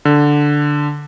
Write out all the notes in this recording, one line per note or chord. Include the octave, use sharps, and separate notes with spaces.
D3